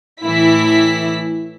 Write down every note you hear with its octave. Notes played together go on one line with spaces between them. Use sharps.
A2 E3 E4 B6